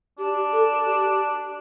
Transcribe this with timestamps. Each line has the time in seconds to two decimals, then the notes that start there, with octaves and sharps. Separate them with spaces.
0.19 D4 G4
0.53 A4
0.86 G4